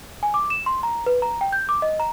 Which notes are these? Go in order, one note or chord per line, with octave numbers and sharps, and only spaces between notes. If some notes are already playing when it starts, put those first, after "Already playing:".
G#5
D6
E7
C6
A#5
B4
A#5
G5
G6
D6
D#5
A#5